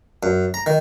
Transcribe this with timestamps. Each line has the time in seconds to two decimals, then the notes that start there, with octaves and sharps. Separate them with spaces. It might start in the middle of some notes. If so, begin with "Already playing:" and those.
0.23 F#2
0.54 A#5
0.66 D#3